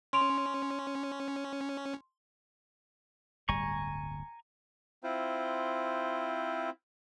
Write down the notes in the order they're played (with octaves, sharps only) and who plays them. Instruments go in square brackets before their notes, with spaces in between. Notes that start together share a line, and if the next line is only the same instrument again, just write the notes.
[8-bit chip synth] C#4 [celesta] C6 D7 F7
[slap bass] D1 G1 G3 [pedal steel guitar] G#5 A#5 C#6
[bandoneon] C4 E4 F4 C5